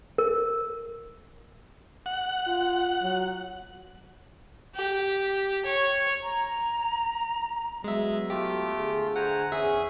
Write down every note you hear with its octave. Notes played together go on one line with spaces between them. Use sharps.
A#4
F#5
F4
F#3
G4
C#5
A#5
F#3 G#3 B3 E5
A3 F4 G4
D3 G#4
C5 F#5 G#5 A#5
E2 C#4 G#4 E5